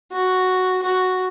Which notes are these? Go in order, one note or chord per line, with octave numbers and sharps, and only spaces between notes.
F#4
F#4